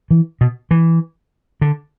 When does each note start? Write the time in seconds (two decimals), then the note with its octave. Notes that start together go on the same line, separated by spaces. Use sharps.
0.11 E3
0.41 B2
0.71 E3
1.61 D3